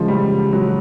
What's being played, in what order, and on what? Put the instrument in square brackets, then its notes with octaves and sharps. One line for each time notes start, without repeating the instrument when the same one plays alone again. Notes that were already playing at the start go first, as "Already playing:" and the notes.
Already playing: [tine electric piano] C#3 E3 G#3 C#4 F4 [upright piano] F3
[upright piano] G3
F#3